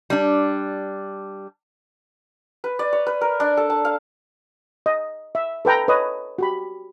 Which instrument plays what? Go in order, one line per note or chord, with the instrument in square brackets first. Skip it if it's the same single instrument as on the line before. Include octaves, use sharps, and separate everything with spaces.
[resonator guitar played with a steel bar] G3 D4
[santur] B4
D5
C#5
B4
A#4
D4
A4
A5
F5
[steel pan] D#5
E5
A4 B4 G5 A#5
B4 C#5 D#5 D#6
F#4 G4 B5